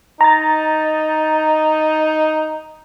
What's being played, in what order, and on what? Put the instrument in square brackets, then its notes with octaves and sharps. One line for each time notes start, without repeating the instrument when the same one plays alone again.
[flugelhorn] D#4 [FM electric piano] A#5 A6